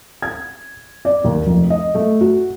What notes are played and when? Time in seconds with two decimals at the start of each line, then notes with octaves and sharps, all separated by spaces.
0.22 G#6
1.05 D5
1.24 D#2
1.46 F1
1.70 D#5
1.94 A3
2.21 F#4